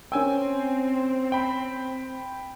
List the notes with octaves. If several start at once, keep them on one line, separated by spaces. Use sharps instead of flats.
C4 C#4 A#4 G5 G#5 E6
G5 B5